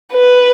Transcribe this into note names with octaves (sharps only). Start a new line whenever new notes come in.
B4